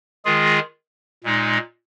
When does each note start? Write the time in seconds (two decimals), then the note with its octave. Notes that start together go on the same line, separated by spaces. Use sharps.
0.25 D#3 G#3 F4 G#4
1.24 A#2 G#3 D#4